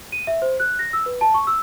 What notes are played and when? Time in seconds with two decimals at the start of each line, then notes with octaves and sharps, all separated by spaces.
0.12 D#7
0.27 E5
0.42 C5
0.60 F#6
0.79 A#6
0.93 E6
1.06 B4
1.21 A5
1.34 C#6
1.47 E6